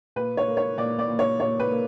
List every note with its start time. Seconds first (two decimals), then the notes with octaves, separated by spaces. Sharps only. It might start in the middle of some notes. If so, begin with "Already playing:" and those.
0.16 A#2 B4
0.37 C#5
0.47 A#3
0.57 C#5
0.78 A#2 D5
0.99 D5
1.09 A#2
1.19 C#5
1.39 A#2 C#5
1.60 B4
1.71 A#3